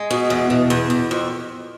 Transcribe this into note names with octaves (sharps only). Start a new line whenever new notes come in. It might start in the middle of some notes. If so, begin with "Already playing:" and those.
Already playing: G#3
B2
E2
B2
E2
E2
F2